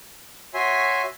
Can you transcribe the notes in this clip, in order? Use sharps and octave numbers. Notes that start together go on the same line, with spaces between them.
F#4 C#5 E5 G#5 C6